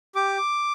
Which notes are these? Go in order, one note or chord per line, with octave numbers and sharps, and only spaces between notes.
G4 D6